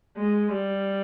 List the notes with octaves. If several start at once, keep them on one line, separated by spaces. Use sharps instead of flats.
G#3
G3